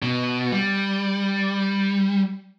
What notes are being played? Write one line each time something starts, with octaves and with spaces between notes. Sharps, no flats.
B2
G3